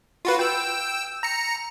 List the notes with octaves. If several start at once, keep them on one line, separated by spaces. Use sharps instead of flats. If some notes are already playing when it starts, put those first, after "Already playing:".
F4 F#4 B4
G5 E6
A#5 C#7